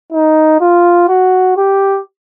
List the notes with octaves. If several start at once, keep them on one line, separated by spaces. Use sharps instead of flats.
D#4
F4
F#4
G4